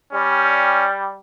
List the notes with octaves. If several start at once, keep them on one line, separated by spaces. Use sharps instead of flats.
G3 C#4